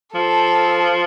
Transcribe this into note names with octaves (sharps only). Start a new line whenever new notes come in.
F3 A4